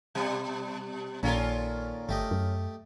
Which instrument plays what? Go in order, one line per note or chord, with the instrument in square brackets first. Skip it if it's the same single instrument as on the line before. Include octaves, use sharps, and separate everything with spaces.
[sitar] B2 G3
[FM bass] A#1 [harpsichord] A#2 D#3 A4 [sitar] C#4 F4 A#4
[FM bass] G1 [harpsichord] A3 G4 D#5
[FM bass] F#2